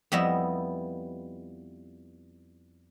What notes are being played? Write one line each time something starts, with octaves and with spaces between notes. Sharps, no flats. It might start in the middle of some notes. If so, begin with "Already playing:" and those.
F2 G3 B3 E4 D#5